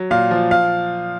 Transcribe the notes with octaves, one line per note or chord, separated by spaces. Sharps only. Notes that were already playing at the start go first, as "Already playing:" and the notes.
Already playing: F#3
A#2 F5
F3
F5